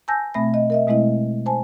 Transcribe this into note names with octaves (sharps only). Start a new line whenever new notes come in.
G#5 A5 E6 G6 A#6
B2 A3 C4 E5 B5 A#6
D#5
A#4 D#5 E5
B2 G#3 A3 C4 E4 D#5
C5 G#5 A5